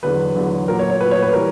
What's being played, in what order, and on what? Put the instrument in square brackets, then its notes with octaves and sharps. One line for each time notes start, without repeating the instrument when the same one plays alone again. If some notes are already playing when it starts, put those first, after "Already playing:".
[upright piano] E2 D3 F#3 B4
E2 D3 F#3
A#2 F#3 A#4
C#5
C#5
A#2 B4
F#3
C#5
B4
E3 G3 A#4